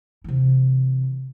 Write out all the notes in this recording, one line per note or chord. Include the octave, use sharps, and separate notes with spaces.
C3 E3